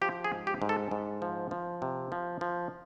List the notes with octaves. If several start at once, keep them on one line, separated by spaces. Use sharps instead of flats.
F3 G4
G#4
G#2
G4
G#2
A4
G#2
F3
F3
C3
F3
F3